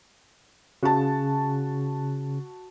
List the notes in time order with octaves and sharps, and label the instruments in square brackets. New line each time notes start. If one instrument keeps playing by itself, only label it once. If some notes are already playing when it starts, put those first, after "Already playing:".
[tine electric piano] C#3 [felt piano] F#4 A5